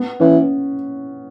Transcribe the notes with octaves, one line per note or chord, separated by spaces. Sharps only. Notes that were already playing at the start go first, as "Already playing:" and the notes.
Already playing: B3
E3 C#4